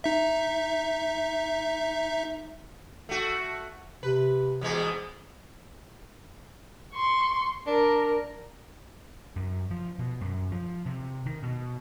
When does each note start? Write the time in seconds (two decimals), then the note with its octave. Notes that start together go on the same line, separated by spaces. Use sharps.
0.04 D#4 E5
3.09 A3 F#4
4.03 C3 B4
4.61 E2 B2 G#3
6.94 C6 C#6
7.67 D4 A#4
9.36 F#2
9.71 F3
9.99 B2
10.21 F#2
10.52 F3
10.86 C3
11.26 D#3
11.43 B2